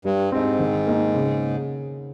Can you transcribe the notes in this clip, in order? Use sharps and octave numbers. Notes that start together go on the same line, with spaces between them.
G2 G3
G#2 C4 D#4
D#3
A#3 D#4
C#3